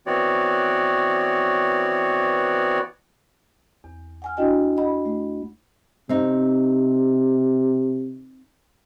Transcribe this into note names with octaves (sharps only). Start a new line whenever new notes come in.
E3 B3 C4 F#4 C#5 D5
E2
F#5 G#5 F6
D4 E4 F#4 D#5 G5 G#5
D#5 F#5 B5
A3
C3 C4 D#4